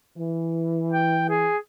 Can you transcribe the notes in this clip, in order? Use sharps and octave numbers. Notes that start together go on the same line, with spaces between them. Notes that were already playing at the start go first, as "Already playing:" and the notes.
E3
G5
G#4